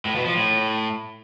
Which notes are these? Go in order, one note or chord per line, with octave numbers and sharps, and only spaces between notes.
A2
B2
F3
A2